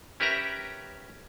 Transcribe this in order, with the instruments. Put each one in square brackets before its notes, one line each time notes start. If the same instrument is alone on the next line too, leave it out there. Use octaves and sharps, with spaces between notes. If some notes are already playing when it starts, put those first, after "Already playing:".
[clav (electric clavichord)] C#4 G4 A#4 B4 E5 A#5